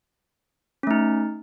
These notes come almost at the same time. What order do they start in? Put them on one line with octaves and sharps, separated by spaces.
C#4 A3 D#4